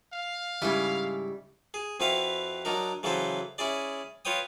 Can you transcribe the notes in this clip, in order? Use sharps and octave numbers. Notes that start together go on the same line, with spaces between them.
F5
G#2 C#3 G3 E4
G#4
F2 C4 E4 F#4 B4 F5
F#3 D4 D#4 A#4
C#3 E3 F#3 E4 A4 C5
C#4 E4 G#4 D5
F4 B4 C#5 G5 D#6